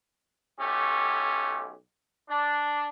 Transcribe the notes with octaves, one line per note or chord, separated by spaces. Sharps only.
B1 A3 C#4 G4
D4